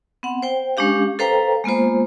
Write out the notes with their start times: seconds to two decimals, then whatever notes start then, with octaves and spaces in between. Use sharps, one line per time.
0.23 B3 C4 F#5
0.42 C5 G5
0.77 G#3 C#4 D4 G4 F5
1.19 A4 B4 C5 F5 G5 A#5
1.64 G#3 A#3 B3 F4 C5